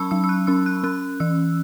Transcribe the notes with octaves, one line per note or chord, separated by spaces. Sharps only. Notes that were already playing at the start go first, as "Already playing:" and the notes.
Already playing: F#3 C#4 A5 B5 C#6 E6
F#3 E6
E6
F#6
C#4 E6
F#6
C#4 F#6
E3 E6